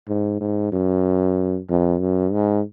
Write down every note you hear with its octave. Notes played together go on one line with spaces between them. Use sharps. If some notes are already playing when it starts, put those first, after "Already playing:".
G#2
G#2
F#2
F2
F#2
G#2